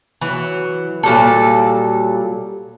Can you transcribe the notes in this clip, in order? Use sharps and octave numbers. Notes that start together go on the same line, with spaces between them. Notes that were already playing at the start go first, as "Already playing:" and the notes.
E3 F#3
A#2 F#3 G3 A4